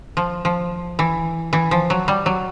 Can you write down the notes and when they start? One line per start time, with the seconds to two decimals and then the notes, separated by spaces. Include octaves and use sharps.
0.17 F3
0.45 F3
0.99 E3
1.53 E3
1.71 F3
1.90 F#3
2.08 G3
2.26 F#3